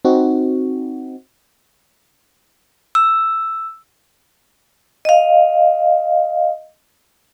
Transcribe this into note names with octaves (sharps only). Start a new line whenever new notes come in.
C4 D#4 F#4
E6
D#5 F5